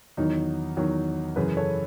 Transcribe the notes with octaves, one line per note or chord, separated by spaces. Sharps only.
E2 D#3 F#3 D#4
E2 D#3 F#3
F#2 C#3 E3 G#4 B4
A4 C#5